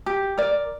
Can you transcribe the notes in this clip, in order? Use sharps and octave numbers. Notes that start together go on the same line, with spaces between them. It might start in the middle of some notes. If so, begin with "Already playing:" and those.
G4
A#4 D5